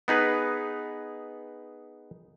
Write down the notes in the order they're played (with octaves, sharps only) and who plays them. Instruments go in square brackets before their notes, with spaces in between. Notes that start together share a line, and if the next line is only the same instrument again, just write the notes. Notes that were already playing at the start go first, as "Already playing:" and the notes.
[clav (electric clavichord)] B3 D#4 G#4 B4